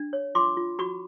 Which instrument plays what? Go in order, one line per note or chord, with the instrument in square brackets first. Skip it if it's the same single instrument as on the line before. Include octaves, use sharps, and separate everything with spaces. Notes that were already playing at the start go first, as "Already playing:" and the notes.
Already playing: [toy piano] D4
C#5
F4 C6 D6
F4
F#4 B5 C#6